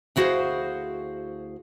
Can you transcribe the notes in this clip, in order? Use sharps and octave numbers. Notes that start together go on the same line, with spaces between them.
D2 E4 F#4 G#4 C5 F5